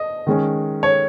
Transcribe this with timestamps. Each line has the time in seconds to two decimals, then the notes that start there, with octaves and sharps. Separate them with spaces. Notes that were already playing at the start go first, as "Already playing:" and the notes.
Already playing: D#5
0.27 D#3 G#3 C#4
0.83 C#5